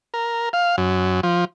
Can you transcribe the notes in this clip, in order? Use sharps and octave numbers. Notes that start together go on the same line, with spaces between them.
A#4
F5
F#2
F3